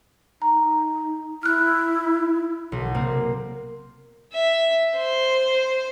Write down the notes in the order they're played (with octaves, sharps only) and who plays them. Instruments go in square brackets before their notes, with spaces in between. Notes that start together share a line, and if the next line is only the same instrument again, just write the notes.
[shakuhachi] D#4 [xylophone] A#5
[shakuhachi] E4 [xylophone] F6 F#6
[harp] B1
C3 A#3 C4
[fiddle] E5
C5